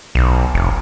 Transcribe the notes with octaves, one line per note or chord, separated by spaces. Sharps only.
B1
F1